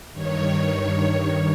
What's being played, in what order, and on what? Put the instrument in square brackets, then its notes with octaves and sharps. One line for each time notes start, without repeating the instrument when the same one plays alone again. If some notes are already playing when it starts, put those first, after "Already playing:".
[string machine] G2 D#3 C#5